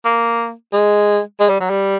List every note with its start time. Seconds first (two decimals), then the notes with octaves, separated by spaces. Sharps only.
0.05 A#3
0.73 G#3
1.40 G#3
1.49 G3
1.60 F#3
1.70 G3